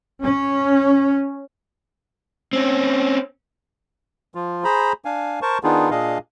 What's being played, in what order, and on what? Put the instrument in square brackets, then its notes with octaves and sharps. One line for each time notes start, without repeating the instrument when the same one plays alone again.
[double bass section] C#4
[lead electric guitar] C4 C#4
[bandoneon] F3 F4
G#4 C5 A#5 B5
D4 F5 G#5
A#4 C5 A5 C#6
D#3 B3 D4 D#4 F4 G#4
A#2 D4 G#4 D#5 F5